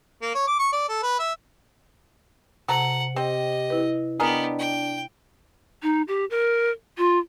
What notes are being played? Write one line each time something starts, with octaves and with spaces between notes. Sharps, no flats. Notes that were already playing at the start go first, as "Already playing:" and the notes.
A#3
C#5
D6
C#6
D5
A4
B4
E5
C3 F#4 A4 F#5 A#5
C4 G4 D#5
E4 B4
B3 D4 G4 G#4 A#4 D#5
G5
D#4
G4
A#4
F4